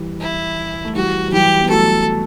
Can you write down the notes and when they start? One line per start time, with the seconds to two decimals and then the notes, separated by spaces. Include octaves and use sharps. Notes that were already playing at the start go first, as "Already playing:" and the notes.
Already playing: E3 G3
0.21 E4
0.85 A3
0.95 E3 G3 F#4
1.28 F#3
1.32 E3 G3 G4
1.60 B3
1.70 F#3 A3 A4